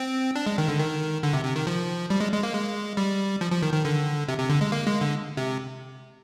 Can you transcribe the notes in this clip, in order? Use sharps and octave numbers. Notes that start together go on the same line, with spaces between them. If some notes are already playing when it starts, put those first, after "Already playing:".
Already playing: C4
D4
G#3
D#3
D3
D#3
D3
C3
C3
D#3
F3
G3
G#3
G#3
A#3
G#3
G3
F3
F3
D#3
D#3
D3
C3
C3
D3
G#3
A#3
G#3
D3
C3